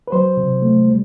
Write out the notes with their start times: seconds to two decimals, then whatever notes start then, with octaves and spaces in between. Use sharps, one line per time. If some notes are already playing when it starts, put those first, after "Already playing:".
0.08 B4
0.12 F#3 C5
0.37 C3
0.62 A3
0.88 G3